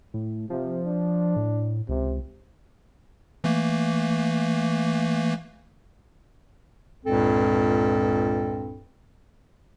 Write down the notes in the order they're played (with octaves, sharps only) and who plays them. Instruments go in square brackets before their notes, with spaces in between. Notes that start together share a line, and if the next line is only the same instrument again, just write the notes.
[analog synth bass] A2
[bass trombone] C3 [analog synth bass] F3
[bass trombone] D4
[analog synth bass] A2
[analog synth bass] C#2 [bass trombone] C3
[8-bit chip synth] E3 A3 A#3
[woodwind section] C#2 G2 A#2 C4 A4